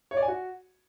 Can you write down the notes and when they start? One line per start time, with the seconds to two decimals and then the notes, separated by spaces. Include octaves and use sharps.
0.11 C#5
0.17 D5
0.22 G#5
0.28 F#4